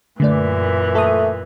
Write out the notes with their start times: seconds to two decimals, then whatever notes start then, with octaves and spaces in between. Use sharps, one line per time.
0.20 F#2 A#2 D3 E3 A3 D5
0.95 A3 A4 D#6